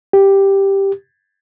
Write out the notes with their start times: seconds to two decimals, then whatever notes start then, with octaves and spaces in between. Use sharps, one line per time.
0.13 G4